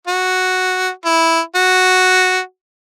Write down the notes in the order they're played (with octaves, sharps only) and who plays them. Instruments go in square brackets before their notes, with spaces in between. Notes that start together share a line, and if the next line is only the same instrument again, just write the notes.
[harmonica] F#4
E4
F#4